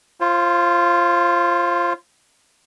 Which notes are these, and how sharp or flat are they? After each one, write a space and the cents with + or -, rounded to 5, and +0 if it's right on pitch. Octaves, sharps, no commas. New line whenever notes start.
F4 -10 C5 +30